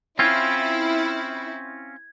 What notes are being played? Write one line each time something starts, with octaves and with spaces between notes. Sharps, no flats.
C4 C#4 E4 F4 G#6